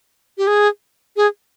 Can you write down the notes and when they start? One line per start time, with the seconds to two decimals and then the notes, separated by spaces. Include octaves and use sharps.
0.38 G4
0.47 G#4
1.16 G#4